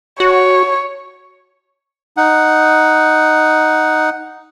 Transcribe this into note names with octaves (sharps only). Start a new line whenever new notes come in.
F#4 C#5
D#4 F#5